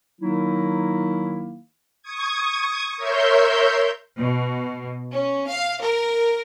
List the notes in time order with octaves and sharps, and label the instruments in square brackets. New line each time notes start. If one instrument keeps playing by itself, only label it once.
[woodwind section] D#3 F#3 A#3 D#4 E4
[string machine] C#6 D#6 G#6
A#4 C#5 E5 C6 G6
[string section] B2
C#4
F5
A#4